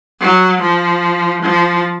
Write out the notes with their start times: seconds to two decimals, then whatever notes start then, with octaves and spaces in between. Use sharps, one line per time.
0.21 F#3
0.62 F3
1.43 F3